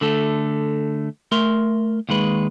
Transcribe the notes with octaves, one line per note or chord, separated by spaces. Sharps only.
D3 A3 A4
A3 A#4 C6
D#2 D#3 G#3 B4